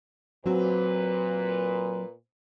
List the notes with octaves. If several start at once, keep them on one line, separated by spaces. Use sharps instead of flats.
A#2 F#3 C4 F#4 B4